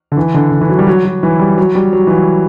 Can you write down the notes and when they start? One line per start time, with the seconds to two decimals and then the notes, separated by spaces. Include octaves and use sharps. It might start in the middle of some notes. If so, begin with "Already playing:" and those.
0.12 D3
0.17 E3
0.34 D3
0.52 D3
0.61 E3
0.69 F#3
0.79 G3
0.87 F#3
1.05 F#3
1.23 E3
1.39 G3
1.58 F#3
1.75 G3
1.93 F#3
2.07 E3
2.10 F#3